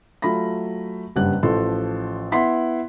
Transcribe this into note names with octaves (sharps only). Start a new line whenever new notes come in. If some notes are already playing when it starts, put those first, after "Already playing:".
F#3 A3 F4 B5 A#6
F#1 G2 C#3 G3 F#5 F#6
A1 F3 A4 C6
B3 E4 F#5 C6 B6